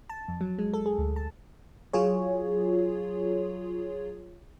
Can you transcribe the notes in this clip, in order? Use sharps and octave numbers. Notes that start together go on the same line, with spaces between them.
A5
F2
F#3
G#3
A4
G#4
D2
A5
F#3 F4 G#4 C#5